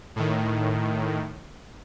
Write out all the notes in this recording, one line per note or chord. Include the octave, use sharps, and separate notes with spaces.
A2 D#3